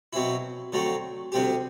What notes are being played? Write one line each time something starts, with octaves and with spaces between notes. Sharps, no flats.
B2 F#3 C4 E4
D3 F#3 A3 C4
D2 C3 G3 C4 G4